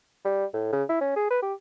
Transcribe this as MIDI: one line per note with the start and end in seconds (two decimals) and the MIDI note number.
0.25 0.45 55
0.54 0.70 45
0.73 0.84 49
0.89 0.99 64
1.01 1.11 61
1.16 1.30 68
1.30 1.39 71
1.42 1.54 67